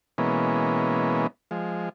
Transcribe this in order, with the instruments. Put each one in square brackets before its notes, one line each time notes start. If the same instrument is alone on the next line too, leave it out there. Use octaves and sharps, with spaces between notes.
[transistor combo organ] B2 E3 G#3 A#3 B3 C#4
F3 G#3